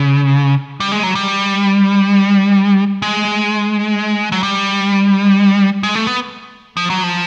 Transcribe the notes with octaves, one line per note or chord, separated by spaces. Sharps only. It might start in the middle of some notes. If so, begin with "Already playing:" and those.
Already playing: C#3
G3
G#3
F#3
G3
G#3
F#3
G3
G#3
A3
B3
F3
F#3
F3